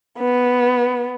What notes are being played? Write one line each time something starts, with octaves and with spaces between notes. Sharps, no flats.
B3